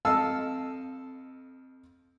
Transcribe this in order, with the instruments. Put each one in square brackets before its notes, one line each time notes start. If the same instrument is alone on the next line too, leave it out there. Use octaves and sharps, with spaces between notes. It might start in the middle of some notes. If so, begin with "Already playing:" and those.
[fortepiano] F2 A4 D#5 F5 A5 E6